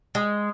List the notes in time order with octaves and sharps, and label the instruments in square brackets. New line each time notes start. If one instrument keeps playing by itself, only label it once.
[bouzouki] G#3